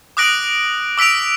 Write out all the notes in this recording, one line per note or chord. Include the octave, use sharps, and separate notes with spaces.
D6 D#6 F#6 A#6 D7 F#7
D6 E6 B6 D7 F7